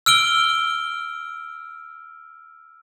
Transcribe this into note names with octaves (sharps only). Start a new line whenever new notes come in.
E6 F6 D7 G7